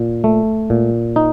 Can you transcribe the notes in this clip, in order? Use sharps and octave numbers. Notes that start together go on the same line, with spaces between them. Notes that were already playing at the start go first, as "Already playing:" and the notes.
Already playing: A#2
A3
A#2
D#4